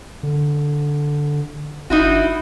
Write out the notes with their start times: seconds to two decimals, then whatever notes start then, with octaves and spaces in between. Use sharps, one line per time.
0.23 D3
1.90 G1 D#4 E4 F#4